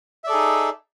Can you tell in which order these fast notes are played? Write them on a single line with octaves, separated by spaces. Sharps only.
E5 D5 A4 G#4 D#4